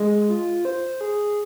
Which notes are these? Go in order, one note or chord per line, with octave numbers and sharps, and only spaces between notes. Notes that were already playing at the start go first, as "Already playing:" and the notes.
Already playing: G#3
F4
C5
G#4